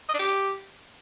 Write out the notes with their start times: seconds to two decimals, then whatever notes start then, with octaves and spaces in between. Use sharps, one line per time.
0.09 D#5
0.14 D4
0.19 G4